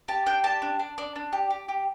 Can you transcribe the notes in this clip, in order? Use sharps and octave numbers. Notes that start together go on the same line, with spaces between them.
G4 A5
D4 G5
G4 A5
D4
D4
D4
D4
G4
G4
G4